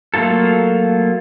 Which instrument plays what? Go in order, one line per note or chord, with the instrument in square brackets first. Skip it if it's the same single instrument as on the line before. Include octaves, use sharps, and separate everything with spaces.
[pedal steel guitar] F#3 A3 A#3 F4 A4